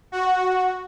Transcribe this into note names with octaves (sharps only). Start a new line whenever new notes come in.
F#4